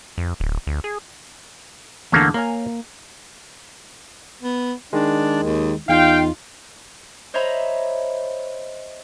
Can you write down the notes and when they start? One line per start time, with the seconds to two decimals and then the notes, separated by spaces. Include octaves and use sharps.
0.18 F2
0.40 D1
0.67 D2
0.84 G#4
2.12 E2 D3 A3 A#3 C#4
2.34 A#3 A#4 C#5 G#5
4.42 B3
4.93 D#3 G#3 D4
5.43 D#2
5.89 E2 D#4 F4 F5 G5
7.34 C5 C#5 D#5 E5 A#5 B5